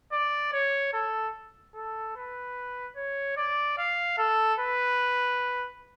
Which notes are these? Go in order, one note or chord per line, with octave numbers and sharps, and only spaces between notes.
D5
C#5
A4
A4
B4
C#5
D5
F5
A4
B4